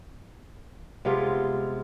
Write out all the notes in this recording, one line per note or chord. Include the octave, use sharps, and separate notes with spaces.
C3 G#3 B3 F4